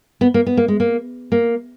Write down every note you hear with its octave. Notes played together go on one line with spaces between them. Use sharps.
B3
A#3
B3
A#3
G#3
A#3
A#3